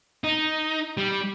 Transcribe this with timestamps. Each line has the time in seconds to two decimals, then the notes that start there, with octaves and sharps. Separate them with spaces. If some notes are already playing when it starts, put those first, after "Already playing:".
0.24 D#4
0.97 G3